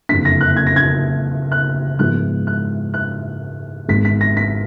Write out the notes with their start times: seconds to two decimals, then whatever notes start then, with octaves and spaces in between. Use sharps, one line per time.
0.09 F#1 F2 D3 B6
0.25 A#6
0.41 F#6
0.57 G#6
0.67 A#6
0.76 G#6
1.52 F#6
1.99 G#2 F3 G#3 B3 F#6
2.47 F#6
2.94 F#6
3.88 G#1 G#2 D#3 G#3 B3 B6
4.05 B6
4.21 A#6
4.37 B6